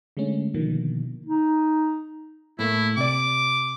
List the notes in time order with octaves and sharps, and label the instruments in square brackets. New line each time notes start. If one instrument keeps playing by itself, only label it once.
[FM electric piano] D3 G#3 A3 C#4
B2 D3 D#3 F3 A#3
[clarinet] D#4
[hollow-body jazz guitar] A2 A3 A#3 [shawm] E4
[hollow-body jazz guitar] C3 D5 [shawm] D6